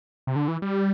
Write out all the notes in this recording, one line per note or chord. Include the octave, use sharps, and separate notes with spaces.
C3
D3
E3
G3